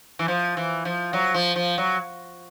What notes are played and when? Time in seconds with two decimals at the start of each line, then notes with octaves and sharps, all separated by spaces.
0.19 E3
0.28 F3
0.57 E3
0.85 F3
1.13 F#3
1.34 F3
1.56 F3
1.78 F#3